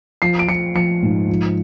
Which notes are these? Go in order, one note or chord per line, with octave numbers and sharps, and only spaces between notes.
F3 C7
D7
F3 C#7
F3 C#7
G#2
F3